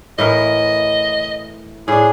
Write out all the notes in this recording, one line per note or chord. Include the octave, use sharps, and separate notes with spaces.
A2 E3 A#4 D#5
A2 D4 G#4